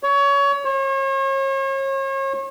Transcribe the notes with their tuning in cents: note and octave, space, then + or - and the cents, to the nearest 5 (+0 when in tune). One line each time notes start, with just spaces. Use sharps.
C#5 +25
C#5 -40